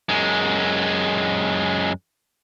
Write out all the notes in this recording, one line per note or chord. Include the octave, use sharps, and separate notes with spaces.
F#2 G#3